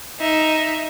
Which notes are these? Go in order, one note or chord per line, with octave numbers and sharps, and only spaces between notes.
D#4 E5